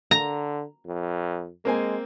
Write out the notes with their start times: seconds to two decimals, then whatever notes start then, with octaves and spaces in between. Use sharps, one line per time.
0.11 D3 A#5
0.86 F2
1.65 G#3 A#3 C4 G#5